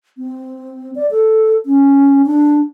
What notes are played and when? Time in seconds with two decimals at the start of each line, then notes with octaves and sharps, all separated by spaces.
0.18 C4
0.95 D5
1.11 A4
1.66 C#4
2.26 D4